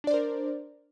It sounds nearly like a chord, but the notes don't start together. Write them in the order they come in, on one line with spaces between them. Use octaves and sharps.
D4 D5 C5 A#4